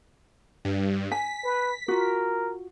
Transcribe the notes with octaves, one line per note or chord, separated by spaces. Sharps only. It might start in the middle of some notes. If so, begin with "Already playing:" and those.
G2
G#5 B6
B4
F4 F#4 A#4